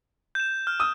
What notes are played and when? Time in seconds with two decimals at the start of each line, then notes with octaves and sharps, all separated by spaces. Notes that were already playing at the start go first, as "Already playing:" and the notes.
0.35 G6 E7
0.67 F6
0.80 D#6